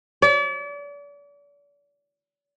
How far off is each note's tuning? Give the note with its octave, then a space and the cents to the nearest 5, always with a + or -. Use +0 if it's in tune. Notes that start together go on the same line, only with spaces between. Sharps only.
D5 -40